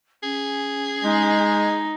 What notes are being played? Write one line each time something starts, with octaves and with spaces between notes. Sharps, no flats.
C#4 G#4
G#3 D#4